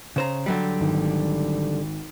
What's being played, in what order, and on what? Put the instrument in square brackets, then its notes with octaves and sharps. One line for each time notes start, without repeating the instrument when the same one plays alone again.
[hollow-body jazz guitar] C#3 C5 A#5
D3 F#3 G3
[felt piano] G#1